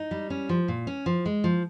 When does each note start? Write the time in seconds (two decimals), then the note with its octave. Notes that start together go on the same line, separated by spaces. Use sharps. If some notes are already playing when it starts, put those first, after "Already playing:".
Already playing: D#4
0.11 G3
0.30 C#4
0.49 F3
0.68 A#2
0.87 C#4
1.06 F3
1.26 G#3
1.44 F3